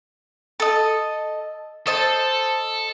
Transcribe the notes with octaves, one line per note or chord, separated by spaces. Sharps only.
A4 D#5
A4 C5 D#5 A5